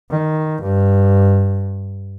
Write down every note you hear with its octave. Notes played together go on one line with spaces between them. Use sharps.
D#3
G2